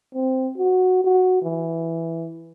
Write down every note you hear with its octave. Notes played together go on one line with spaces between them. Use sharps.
C4
F#4
F#4
E3